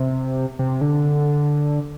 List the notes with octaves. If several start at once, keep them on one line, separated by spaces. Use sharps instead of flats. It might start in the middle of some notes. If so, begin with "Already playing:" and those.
Already playing: C3
C3
D3